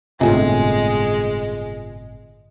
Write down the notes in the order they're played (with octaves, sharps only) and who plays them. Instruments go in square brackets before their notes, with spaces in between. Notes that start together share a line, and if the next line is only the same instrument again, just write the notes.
[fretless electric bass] G1 A2 C3 [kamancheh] G#3 [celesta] F4 D#5 G#5